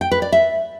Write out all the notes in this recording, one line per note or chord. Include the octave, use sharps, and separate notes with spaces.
G5
B4
D5
E5